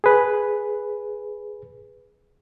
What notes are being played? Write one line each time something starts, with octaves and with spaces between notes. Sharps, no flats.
G#4 B4